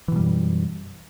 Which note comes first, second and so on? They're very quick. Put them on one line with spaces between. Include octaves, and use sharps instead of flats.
E3 B2 G3 F#2